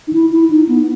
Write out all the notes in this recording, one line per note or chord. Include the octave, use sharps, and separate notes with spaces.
D#4
E4
E4
D#4
B3